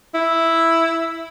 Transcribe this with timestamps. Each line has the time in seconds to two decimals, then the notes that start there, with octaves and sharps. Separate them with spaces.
0.15 E4